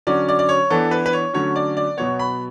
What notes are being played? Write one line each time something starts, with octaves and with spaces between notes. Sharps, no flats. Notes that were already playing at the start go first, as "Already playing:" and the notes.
D3 F#3 C#4 D5
D5
D5
C#5
E3 B3 D4 A4
B4
B4
C#5
D3 F#3 A3 C#4 C#5
D5
D5
B2 F#3 B3 C#5
B5